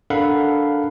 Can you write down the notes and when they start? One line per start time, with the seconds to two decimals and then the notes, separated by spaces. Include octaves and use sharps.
0.10 D4 A4 A#4 F5 F#5 B5